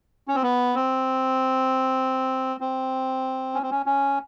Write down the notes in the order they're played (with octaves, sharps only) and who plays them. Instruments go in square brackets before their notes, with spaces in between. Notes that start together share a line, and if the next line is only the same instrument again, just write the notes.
[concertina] C#4
C4
B3
C4
C4
C#4
C4
C#4
C#4